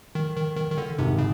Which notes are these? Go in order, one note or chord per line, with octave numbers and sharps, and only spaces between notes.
D#3
D#3
D#3
D#3
D3
G#1 G#2 C3
C#3